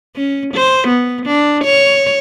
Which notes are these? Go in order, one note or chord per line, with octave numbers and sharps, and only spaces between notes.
C#4
C5
B3
D4
C#5